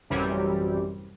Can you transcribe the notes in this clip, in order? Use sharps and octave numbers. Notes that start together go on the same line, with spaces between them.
A1 F#2 C3 E3 G3